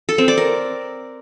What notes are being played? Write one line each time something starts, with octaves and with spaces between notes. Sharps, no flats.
A4
C4
D5
A#4